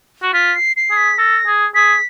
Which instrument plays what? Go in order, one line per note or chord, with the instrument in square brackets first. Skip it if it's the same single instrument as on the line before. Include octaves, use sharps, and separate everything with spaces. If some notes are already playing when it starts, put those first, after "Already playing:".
[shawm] F#4
[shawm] F4 [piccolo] B6
[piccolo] C7
C7
[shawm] G#4
[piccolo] B6
[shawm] A4 [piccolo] A#6
[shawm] G#4
[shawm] G#4 [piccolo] B6